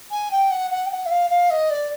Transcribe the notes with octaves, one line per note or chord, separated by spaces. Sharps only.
G#5
G5
F#5
F#5
G5
F#5
E5
F5
F5
D#5
D5